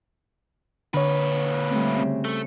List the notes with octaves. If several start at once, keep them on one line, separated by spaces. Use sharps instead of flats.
A#2 D3 B4 C#5
G3 A3 C4
C#3 C4
A3